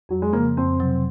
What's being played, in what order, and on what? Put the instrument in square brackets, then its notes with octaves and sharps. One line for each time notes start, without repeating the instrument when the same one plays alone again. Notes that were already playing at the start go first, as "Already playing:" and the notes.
[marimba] F2 [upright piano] F#3
[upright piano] G#3
[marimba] C#3 F3 [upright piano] A#3
[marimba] F2 [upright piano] C4
[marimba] C3 F#3